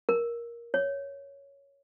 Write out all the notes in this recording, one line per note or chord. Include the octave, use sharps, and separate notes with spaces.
A#4
C#5